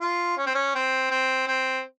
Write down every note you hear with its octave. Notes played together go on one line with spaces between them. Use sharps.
F4
C#4
C4
C#4
C4
C4
C4